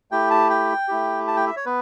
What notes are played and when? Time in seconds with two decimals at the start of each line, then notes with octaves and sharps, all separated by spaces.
0.11 A3 E4 G4 G5
0.31 A5
0.50 G5
0.88 A3 E4 G4
1.28 A5
1.36 G5
1.47 E5
1.56 C#5
1.66 B3 B4